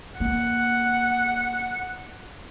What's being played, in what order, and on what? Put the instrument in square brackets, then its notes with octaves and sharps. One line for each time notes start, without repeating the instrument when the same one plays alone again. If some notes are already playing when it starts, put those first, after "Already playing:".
[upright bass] A#3 [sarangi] F#5